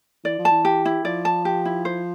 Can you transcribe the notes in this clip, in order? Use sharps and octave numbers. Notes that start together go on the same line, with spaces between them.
E3 D5
F3
A5
E3
G4
E4
F3 D5
A5
G4
E4
C5